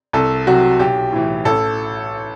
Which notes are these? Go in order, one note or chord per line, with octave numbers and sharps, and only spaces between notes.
C2 A4
C3 F#3 F#4
B1 G4
A2 E3
A1 A4